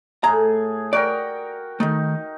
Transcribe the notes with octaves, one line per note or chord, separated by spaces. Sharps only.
A2 G#4 A#5
F#4 A#4 D5 G5
D#3 A3 D#4